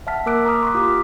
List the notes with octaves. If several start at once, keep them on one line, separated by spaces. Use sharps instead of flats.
E5 F#5 A5 F6 B6
A#3 A#4 D6 E6 F#6 D7
A#5 D6 D#6 F6
C6 C#6 B6
F4 G4 D6